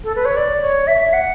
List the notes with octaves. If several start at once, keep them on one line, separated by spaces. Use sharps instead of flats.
A4
B4
C#5
D5
C#5
E5
F#5